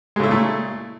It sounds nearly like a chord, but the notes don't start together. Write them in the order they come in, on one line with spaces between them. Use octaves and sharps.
G#3 C#3 E4 A#2 A3